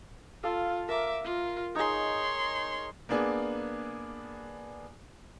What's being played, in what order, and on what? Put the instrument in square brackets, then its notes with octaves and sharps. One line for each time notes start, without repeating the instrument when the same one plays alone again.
[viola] F4 [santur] A4 F5
[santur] A#4 [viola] E5 D6
[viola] F4
[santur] D#4 G#4 [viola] C#5 C6
[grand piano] A#3 B3 D4 G#4